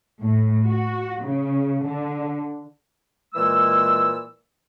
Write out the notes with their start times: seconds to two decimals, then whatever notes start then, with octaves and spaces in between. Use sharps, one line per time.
0.21 A2
0.65 F#4
1.22 C#3
1.82 D3
3.34 A#2 E3 G#3 E4 E6